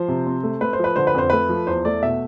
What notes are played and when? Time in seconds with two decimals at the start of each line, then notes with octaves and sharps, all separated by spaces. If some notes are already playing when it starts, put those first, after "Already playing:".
Already playing: F3 C5
0.08 C3
0.26 C4
0.43 A3
0.61 A3 B4
0.73 C5
0.79 F3 B4
0.96 D3 C5
1.07 B4
1.14 F2 C5
1.30 A3 B4
1.49 F3
1.67 E2 C5
1.85 A3 D5
2.02 B2 E5